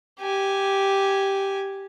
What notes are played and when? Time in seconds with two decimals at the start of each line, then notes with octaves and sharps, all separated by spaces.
0.19 G4 G#5